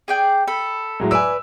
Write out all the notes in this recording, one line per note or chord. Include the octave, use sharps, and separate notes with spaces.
G#4 D5 G5
A4 B5
A2 F#3 G#3
B4 D5 G#5 E6